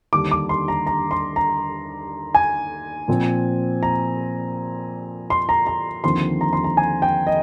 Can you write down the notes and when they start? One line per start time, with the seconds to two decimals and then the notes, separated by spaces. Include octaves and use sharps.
0.13 D#2 D3 G3 D4 D6
0.31 D6
0.49 C6
0.68 A#5
0.87 A#5
1.11 C6
1.36 A#5
2.35 G#5
3.08 A#2 F3 C4
3.83 A#5
5.30 C6
5.49 A#5
5.67 A#5
6.04 D#2 D3 F3 C4 C6
6.41 A#5
6.53 C6
6.64 A#5
6.77 G#5
7.02 G5
7.27 D#5